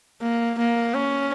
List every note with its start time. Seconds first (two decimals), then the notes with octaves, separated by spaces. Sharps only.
0.22 A#3
0.58 A#3
0.94 C#4